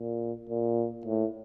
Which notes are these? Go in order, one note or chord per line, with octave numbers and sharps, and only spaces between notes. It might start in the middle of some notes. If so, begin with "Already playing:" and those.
Already playing: A#2
A#2
A2